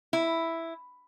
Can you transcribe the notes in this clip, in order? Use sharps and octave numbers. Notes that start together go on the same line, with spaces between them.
E4